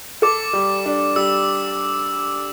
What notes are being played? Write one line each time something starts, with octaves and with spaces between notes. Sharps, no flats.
A4 D6
G3
D4
G3 E6